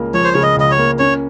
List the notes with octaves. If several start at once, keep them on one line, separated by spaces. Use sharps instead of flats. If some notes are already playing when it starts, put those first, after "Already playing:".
Already playing: C#2 C#3 A#3
F3 C#5
C5
C#3 C#5
D#5
C#2 D#5
C#5
A#3
C#4 C#5